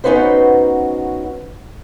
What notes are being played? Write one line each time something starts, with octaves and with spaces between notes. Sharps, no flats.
B3 C#4 D#4 F#4 B4 C5